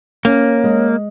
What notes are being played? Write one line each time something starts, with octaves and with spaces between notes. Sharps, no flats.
A#3 C#4
G#3